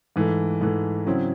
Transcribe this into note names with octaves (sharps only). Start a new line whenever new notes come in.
G#2 E3 A3
G#2 E3 A3
C#3 F#3 C4 E4